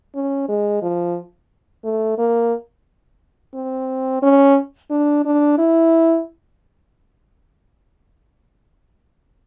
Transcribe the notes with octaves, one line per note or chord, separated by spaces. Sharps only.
C#4
G#3
F3
A3
A#3
C4
C#4
D4
D4
E4